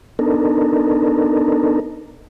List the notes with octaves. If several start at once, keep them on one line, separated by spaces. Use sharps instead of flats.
B3 D4 D#4 A4 A#4